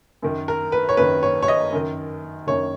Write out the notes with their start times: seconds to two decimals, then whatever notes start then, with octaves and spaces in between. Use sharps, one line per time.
0.22 F#2 D#3
0.48 A#4
0.72 B4
0.89 C#5
0.97 F#2 D#3 B4
1.23 C#5
1.42 C#5
1.48 D#5
1.72 F#2 D#3
2.47 F#2 D#3 C#5